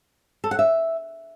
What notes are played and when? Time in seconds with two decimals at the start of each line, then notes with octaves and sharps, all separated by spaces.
0.44 A4
0.51 F#5
0.59 E5